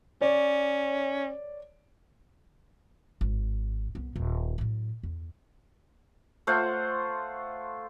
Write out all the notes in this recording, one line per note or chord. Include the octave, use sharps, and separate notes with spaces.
C#4 C#5 D5
G#1
C2 B3
D#1
A2 F#3
E2
A3 F4 C5 F#5